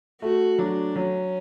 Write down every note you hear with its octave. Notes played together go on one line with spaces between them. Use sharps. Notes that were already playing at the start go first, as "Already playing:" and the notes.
A3 F#4
F#3 D4
F#3 C#4